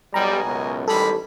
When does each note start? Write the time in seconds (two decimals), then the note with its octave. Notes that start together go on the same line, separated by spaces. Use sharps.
0.14 B1 G3 D#5 G#5 A#5
0.44 C#2 F#2 B2
0.88 A1 D#3 G3 G#3 A4 B5